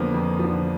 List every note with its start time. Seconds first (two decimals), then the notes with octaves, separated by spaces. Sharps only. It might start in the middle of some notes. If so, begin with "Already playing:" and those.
Already playing: F2 D3 F3 A#3 B3
0.14 F2
0.39 D3 F3